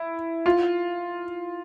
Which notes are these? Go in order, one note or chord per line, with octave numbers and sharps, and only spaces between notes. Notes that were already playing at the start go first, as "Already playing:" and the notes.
Already playing: E4
F4